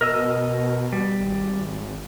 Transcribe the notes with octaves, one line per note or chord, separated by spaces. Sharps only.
B2 A#4 D#5 E6
G3
G#1